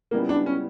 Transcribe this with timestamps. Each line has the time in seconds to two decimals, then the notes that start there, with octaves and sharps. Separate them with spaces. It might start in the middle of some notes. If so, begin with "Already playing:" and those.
0.11 C#2 C#3 G3 A#3 B3 E4
0.29 D4
0.46 C#4